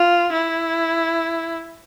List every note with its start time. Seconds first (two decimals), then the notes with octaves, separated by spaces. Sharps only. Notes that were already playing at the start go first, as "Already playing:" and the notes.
Already playing: F4
0.33 E4